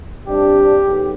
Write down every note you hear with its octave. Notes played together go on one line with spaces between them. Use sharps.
C3 G3 D4 G4
B1